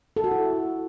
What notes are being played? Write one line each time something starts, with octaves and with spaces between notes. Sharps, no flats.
A4
F#4
E4